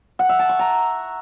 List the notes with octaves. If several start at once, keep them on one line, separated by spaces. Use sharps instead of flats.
F#5
E5
A5
C#6
A#5